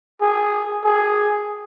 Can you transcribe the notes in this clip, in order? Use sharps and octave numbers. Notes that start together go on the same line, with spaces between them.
G#4
G#4